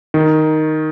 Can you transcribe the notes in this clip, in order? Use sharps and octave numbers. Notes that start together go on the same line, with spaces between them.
D#3